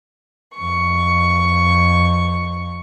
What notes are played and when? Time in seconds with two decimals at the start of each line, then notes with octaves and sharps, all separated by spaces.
0.58 F2 C#6